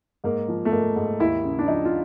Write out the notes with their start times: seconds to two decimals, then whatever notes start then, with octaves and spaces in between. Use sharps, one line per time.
0.24 G#2 A#3
0.48 F3
0.65 A3
0.72 G#2 A#3
0.96 G#2
1.20 D#2 E4
1.44 C#3
1.59 D4
1.68 F3 D#4
1.85 F4